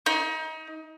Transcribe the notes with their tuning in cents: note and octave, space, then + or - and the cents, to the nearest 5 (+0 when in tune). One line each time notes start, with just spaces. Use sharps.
D#4 +30